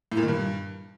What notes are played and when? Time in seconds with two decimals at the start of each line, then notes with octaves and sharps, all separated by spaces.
0.12 A2
0.17 A#2
0.23 D#3
0.28 G2